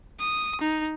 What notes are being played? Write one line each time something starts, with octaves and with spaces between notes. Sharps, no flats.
D#6
D#4